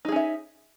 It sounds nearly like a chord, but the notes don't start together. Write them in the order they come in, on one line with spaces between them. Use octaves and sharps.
D#4 G#4 C#4 E5